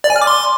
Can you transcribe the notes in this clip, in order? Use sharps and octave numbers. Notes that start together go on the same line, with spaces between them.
D5
G#5
F6
D6
C6